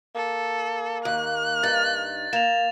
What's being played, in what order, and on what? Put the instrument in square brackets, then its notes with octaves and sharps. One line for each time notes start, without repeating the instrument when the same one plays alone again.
[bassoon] A#3 [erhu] A4
[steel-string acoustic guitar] D#2 [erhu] F#6
[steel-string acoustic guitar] G2 D#4 [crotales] A6
[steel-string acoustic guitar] A#3 [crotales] E7 F7